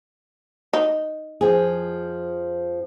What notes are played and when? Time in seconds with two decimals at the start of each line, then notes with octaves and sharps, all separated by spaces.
0.73 D#4
1.41 F2 F3 G#4